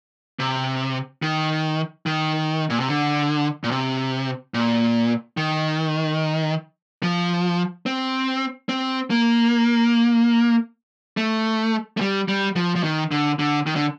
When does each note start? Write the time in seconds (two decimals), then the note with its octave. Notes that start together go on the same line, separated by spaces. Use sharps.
0.40 C3
1.22 D#3
2.06 D#3
2.70 A#2
2.80 C3
2.88 D3
3.64 A#2
3.71 C3
4.54 A#2
5.37 D#3
7.03 F3
7.86 C4
8.69 C4
9.10 A#3
11.17 A3
11.97 A3
12.01 G3
12.28 G3
12.56 F3
12.75 F3
12.84 D#3
13.11 D3
13.39 D3
13.66 D#3
13.76 D3